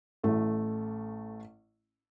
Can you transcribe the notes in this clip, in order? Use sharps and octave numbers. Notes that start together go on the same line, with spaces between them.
A1 A3